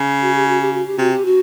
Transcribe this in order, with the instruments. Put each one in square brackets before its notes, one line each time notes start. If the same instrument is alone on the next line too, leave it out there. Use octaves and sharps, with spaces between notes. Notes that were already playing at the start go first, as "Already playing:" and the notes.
Already playing: [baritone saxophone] C#3
[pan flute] F#4
G4
F#4
G4
F#4
G4
[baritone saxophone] C3 [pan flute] F#4
[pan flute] G4
F#4